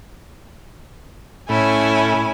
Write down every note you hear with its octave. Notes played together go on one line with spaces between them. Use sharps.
A2 C#4 E4 G#5